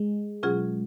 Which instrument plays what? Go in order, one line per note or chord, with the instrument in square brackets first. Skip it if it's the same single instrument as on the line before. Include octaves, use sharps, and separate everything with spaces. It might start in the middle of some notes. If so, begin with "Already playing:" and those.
Already playing: [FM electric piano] G#3
[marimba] B2 F#3 C#4 F4 G#4